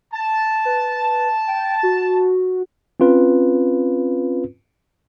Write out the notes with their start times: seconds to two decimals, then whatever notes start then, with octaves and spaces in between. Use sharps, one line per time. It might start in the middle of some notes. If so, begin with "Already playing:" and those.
0.13 A5
0.65 B4
1.47 G5
1.83 F#4
3.00 C4 C#4 F4 B4